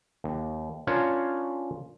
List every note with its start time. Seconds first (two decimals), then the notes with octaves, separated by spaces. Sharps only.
0.24 D#2
0.87 C#4 D4 F4 A#4 C5 C#5